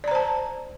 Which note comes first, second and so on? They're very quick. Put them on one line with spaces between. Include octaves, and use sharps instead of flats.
D5 A#5 C5 A5